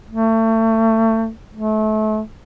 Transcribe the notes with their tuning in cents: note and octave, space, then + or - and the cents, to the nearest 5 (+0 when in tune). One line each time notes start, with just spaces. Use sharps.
A3 +30
A3 -30